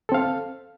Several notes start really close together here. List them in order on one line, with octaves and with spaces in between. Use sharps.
A4 C4 F5